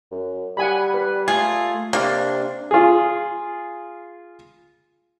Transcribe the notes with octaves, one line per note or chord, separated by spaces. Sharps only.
F#2
G3 F#5 G#5 B5
B4
A3 F4 G#4
C3 A#3 D4
F4 G#4